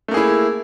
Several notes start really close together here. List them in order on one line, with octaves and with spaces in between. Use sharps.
A3 A#3 G#4 E4